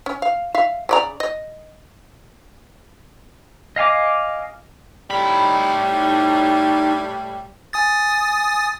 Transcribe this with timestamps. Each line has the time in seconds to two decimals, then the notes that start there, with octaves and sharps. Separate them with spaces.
0.06 C#4
0.22 F5
0.54 E5 F5
0.89 C#3 D5 A#5
1.20 D#5
3.76 D#5 F5 G#5 D6
5.11 A2 G3 D#4 B5
7.73 G#5 D#6 A6